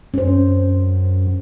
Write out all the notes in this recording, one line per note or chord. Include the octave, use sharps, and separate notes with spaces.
F#2 C#4 C5